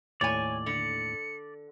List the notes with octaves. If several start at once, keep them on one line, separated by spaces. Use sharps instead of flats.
D#2 A2 C#5 D5 G#5
D3 C#7